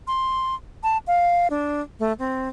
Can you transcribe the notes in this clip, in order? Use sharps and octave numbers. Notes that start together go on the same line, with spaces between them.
C6
A5
F5
D4
A3
C4